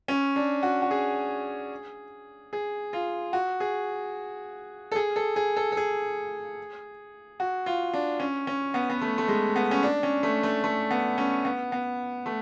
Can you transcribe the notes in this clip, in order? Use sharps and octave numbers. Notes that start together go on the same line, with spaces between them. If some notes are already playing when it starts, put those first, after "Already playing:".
C#4
D4
F#4
F#4
G#4
G#4
F4
F#4
G#4
A4
G#4
A4
G#4
A4
A4
G#4
F#4
F4
D4
C#4
C#4
B3
B3
A3
A3
G#3
B3
C#4
D4
C#4
A3
A3
A3
B3
C#4
B3
B3
A3